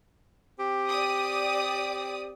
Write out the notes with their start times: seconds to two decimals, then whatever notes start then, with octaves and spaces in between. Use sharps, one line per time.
0.58 C4 G4
0.87 D5 D#6